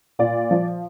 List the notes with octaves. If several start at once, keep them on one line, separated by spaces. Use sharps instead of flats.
A#2 D5
F3